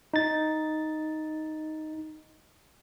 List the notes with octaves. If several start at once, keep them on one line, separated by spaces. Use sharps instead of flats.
D#4 A6